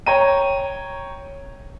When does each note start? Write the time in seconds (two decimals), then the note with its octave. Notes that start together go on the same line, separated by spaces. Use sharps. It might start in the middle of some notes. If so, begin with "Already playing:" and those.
0.06 C#5 G5 A#5 D#7